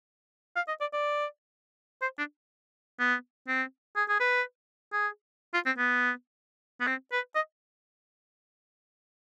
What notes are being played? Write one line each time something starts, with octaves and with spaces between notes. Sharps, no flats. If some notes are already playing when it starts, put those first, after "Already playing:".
F5
D#5
D5
D5
C5
D4
B3
C4
G#4
G#4
B4
G#4
F4
C4
B3
B3
C4
B4
D#5